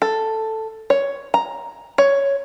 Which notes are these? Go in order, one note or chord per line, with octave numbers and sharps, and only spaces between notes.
A4
C#5
A#5
C#5